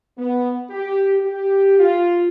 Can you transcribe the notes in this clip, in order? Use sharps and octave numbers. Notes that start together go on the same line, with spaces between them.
B3
G4
G4
F4